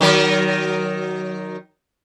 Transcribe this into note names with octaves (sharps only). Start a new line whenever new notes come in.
D#3 F#3 A#4